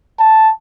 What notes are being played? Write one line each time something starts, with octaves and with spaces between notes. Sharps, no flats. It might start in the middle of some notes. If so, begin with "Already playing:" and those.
A5